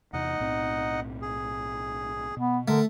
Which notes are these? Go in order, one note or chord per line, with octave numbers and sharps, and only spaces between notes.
E2 C3 D#4 D#5 F#5
B1 A2 C4
G#4
B2 B3
D3 A3 A#4